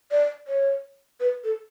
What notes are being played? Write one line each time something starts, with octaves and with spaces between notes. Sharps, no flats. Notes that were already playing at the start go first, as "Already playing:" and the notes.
D5
C#5
B4
A4